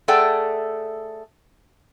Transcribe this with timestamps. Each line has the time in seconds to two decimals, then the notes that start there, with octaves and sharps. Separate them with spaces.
0.08 A3 G#4 A4 D5 F#5 G5